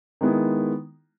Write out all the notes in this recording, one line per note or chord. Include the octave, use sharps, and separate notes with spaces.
D#3 G#3 B3 E4